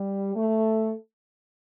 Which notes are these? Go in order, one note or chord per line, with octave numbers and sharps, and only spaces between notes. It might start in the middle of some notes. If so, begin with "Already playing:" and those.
Already playing: G3
A3